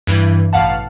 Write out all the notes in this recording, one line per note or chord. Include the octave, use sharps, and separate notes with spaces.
G2 E3
A1 B2 F5 F#5 A5